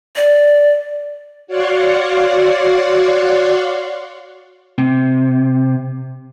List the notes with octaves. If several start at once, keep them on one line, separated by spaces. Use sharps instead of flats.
D5
F#4 C#5 D5 F5 F#5 C6
C3